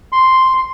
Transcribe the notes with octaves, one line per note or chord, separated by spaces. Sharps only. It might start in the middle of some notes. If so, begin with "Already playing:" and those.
C6